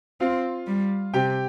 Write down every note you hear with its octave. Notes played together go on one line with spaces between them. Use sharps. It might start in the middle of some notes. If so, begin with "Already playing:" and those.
C4 F4 F5
G3
C3 G4 G5